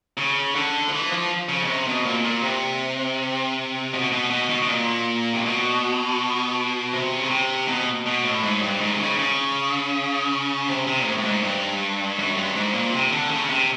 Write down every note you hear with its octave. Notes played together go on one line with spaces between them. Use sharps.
C#3
D3
F3
E3
F3
C#3
B2
C3
B2
A#2
A#2
C3
B2
B2
B2
B2
B2
A#2
C3
B2
C3
C#3
C3
B2
B2
A2
G#2
G2
G#2
C3
C#3
C#3
C3
C3
A#2
A2
A2
G#2
G2
F#2
G2
G#2
A#2
C3
D3
C#3
C3